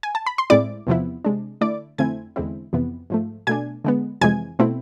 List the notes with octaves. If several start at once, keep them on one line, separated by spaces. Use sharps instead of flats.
G#5
A5
B5
C6
A2 G#3 C4 E4 D5 D6
E2 C3 F3 B3 E4
C3 G#3 D4
D3 A3 E4 D5 D6
F2 D3 A3 C4 E4 G#5 G#6
E2 D3 G#3 C4 E4
F2 C3 E3 B3
G#2 F3 A3
B2 A3 D4 G#5 G#6
D3 G#3 B3
F2 C3 E3 G#3 G#5 G#6
B2 A3 C4 E4